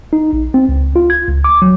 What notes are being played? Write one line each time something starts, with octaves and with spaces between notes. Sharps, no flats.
D#4
A#1
C4
C#2
F4
G#6
C#2
D6
F#3